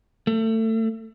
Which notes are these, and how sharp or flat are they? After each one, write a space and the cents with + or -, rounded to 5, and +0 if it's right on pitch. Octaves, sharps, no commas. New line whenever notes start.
A3 +25